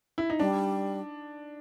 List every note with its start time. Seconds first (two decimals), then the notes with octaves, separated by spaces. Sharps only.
0.18 E4
0.30 D#4
0.40 G3 D4